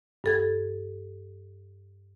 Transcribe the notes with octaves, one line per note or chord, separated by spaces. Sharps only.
G2 A4 G#6